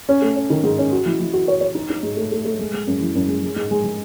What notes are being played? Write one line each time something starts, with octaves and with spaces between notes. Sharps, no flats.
C#4
A3
C#4
D#3
G#2
C#4
F#4
E3
E3
F#4
C#5
C#5
D#4
D#4
G#2
A3
A3
A3
G#3
G#3
F#2
E3
F#2
G#3
G#3
G#2
G#3
G#3